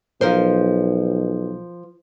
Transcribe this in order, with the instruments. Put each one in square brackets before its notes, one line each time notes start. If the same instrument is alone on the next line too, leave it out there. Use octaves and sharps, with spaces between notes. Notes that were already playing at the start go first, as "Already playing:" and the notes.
[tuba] B1 [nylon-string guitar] F3 A#4 C5